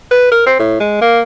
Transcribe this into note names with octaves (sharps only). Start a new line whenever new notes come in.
B4
A#4
C4
A2
G#3
A#3